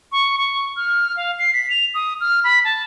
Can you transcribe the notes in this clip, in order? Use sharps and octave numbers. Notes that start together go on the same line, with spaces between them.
C#6
C#6
F6
F5
C7
B6
F7
D#6
F6
B5
A5